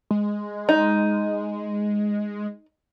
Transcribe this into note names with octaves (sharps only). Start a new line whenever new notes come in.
G#3
D#4